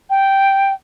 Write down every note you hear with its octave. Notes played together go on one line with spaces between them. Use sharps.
G5